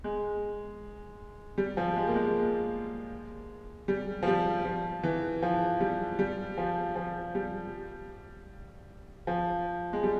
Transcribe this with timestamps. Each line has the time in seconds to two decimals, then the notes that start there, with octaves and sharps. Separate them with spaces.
0.04 G#3
1.58 G3
1.77 F3
1.96 G#3
2.08 A#3
2.16 G#3
3.88 G3
4.23 F3
4.27 G3
4.65 F3
5.03 E3
5.42 F3
5.81 G3
6.19 G3
6.58 F3
6.96 F3
7.35 G3
9.27 F3
9.93 G#3
10.03 G3